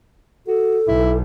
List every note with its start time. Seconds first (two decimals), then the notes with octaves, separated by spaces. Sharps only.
0.47 F#4 A4
0.87 B1 E4